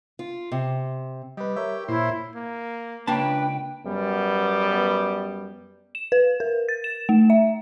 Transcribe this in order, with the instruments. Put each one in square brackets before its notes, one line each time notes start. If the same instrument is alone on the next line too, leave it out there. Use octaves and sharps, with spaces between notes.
[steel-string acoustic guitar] F4
C3
[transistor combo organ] G3 [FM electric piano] B4 D#5
[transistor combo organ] G4 [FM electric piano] A#4 C#5 E5
[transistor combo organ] A#2 C5 [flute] E4
[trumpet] A#3
[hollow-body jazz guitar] C#2 A#3 A5 [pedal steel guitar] D4 B5 [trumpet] B4 [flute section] G5
[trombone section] F#2 G3 B3
[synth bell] E7
B4
A#4
A6
E7
A3
E5